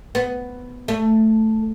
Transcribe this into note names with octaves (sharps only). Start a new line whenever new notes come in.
B3
A3